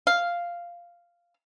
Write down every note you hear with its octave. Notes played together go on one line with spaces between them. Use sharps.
F5